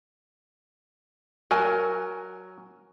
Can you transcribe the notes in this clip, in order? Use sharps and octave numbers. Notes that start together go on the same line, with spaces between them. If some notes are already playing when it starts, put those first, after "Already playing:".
F#3 A#4 G#5